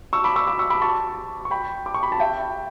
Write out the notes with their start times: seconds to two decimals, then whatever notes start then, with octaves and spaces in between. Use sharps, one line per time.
0.13 C#6 E6
0.24 B5 D6
0.36 C#6 E6
0.47 B5 D6
0.59 C#6 E6
0.70 B5 D6
0.82 A5 C#6
1.45 C#6
1.51 G5 B5
1.86 D6
1.94 C#6
2.03 B5
2.12 A5
2.20 E5 G5